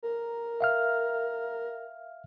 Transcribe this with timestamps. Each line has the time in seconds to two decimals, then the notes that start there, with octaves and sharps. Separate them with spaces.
0.03 A#4
0.61 E5 F5 F6